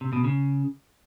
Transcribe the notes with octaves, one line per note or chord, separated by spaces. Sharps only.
C3
B2
C#3